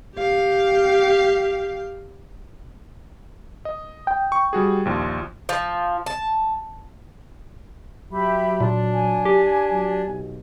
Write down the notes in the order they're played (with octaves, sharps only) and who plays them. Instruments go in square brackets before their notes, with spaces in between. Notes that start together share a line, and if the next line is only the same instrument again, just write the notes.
[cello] G4 F5
[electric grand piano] D#5
[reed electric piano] G5
[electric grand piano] C#6
G3 F#4 G#4
A#1 D#2 F4
[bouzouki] F3
A5
[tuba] F#3 [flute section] G4 E5 B5
[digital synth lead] A#2 [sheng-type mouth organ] D4
[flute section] G#5
[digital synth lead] G4
[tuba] F#3
B1